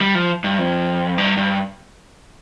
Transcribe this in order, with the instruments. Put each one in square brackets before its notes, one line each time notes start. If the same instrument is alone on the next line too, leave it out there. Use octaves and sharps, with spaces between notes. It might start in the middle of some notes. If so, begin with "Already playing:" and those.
[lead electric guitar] G3
F3
G2
F2
G2
G2